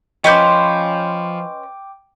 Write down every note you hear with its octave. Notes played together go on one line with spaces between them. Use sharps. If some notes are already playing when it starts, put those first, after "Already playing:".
F3 C#4 B4 C5 D#5 G5 D6 G6